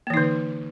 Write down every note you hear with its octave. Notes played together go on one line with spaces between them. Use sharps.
D3 E3 A#3 D#4